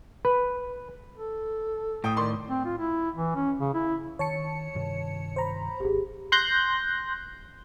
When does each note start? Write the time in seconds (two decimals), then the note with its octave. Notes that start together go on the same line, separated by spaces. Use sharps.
0.25 B4
1.16 A4
2.04 A2 G5 D#6
2.16 D#3 D5 C6
2.49 C4
2.65 F4
2.78 E4
3.15 E3
3.35 C#4
3.59 C#3
3.74 E4
4.19 D#3 C#5 A5 C#7
4.75 G2 C3 D#3
5.36 C5 A#5 B5
5.80 D1 G#1 G4 G#4
6.32 C6 F#6 G6 A#6